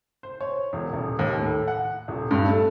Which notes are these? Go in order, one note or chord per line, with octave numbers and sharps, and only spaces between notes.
C5
C#5
E1
D#1
D#2
A2
F#5
D#1
G2
A3